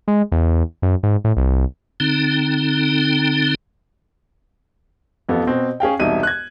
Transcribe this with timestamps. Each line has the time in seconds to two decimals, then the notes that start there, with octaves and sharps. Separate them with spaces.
0.08 G#3
0.32 E2
0.82 F#2
1.03 G#2
1.24 A2
1.37 C2
2.00 D3 C4 D#4
5.29 A1 F2 B3 A4 F5
5.47 B2 C4
5.80 C#4 G#4 F5 G5
5.99 E1 C2 D#4 E5 D#7
6.23 F#6 G#6